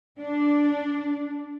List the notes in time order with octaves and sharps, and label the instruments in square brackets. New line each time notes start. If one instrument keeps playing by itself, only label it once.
[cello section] D4